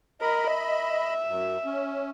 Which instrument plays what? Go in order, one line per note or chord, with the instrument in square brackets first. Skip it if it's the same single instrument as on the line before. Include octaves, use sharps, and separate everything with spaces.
[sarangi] A#4 [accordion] D#5 B5
[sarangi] E5
[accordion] F#2
C#4